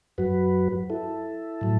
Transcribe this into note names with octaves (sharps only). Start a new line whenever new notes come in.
F#2 F#3 F#4 B4
E4 A4
A2 F#3